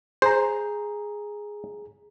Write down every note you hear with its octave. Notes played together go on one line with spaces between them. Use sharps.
G#4 C5 A#5